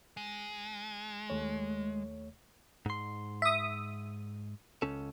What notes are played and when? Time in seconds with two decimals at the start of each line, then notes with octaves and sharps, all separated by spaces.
0.17 G#3
1.30 D#2 A3 C#5
2.86 G#2 C6
3.42 E5 D#6
4.82 C#2 C#4 A4